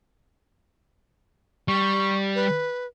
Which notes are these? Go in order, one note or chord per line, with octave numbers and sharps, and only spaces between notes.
G3 C#6
B4